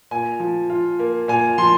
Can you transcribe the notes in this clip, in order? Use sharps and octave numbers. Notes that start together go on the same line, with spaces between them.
A#2 G#5
F3
F4
A#3
A#2 G#5
F3 C6